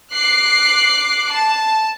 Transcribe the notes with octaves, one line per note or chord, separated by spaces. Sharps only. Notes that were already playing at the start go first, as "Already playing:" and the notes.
D6 F#6 C7
A5